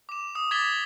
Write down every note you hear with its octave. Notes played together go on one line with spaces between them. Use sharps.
D6 E7
D#6
D6 G#6 A6 B6 E7 G7